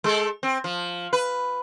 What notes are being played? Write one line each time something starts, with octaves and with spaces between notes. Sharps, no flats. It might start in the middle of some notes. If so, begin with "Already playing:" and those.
G#3 A4
C4
F3
B4